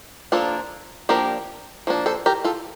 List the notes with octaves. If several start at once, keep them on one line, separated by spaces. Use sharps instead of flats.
F3 A#3 D4 F4 A4
F3 A#3 D4 G4 A#4
F3 A#3 D4
A4 C5
G4 A#4
F4 A4